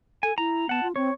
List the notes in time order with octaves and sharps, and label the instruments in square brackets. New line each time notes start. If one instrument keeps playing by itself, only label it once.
[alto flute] A4 [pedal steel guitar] G#5
[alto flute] E4 [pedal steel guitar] A#5
[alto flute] B3 [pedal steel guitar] F#5 A5
[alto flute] F4
[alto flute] C4 [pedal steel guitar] C#5